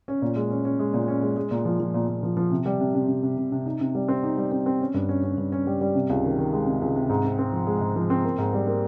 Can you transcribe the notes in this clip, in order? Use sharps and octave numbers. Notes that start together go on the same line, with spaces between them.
C#4
A#2
G#3
C#4
C#4
G#3
A#2
C#4
G#3
G#3
A#2
F3
F3
A#2
A#2
F3
F3
C3
G3
C3
C3
C3
C3
C3
C3
D#4
C3
G3
C4
D#4
G3
C4
C4
C#4
G2
C#4
C#4
G2
C#4
G3
G3
C3
C#2
D#3
D#3
G#3
C3
C#2
C3
G#2
C4
C4
F3
G#3
G#2
F3
C4
A#3
G#2
G3
A#3